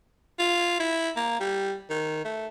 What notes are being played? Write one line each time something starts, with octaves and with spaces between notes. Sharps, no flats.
F4
E4
A#3
G3
D#3
A3